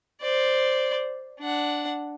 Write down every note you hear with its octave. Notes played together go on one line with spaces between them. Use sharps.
C5 D5
D4 F#5